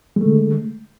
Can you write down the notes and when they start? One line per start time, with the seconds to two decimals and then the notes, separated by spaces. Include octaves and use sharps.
0.16 G#3
0.21 A3
0.26 D3